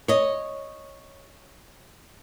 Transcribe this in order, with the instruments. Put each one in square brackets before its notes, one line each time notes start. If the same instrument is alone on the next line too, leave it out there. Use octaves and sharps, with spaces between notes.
[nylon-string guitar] C#5 D#5